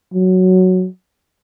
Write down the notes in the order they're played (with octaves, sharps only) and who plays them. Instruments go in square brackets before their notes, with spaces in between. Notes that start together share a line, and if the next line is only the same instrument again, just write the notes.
[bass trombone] F#3